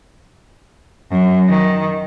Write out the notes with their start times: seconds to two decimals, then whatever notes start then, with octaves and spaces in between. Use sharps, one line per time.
1.11 F#2
1.48 D#3